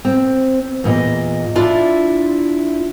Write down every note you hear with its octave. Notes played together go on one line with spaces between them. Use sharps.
C4
E2 A#2 D#5
D4 E4 F4 D5 E5